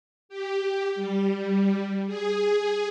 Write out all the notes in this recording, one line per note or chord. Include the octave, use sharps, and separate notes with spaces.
G4
G3
G#4